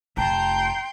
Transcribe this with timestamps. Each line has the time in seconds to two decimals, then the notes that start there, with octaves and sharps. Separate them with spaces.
0.17 F1 G5 A5 A#5 C6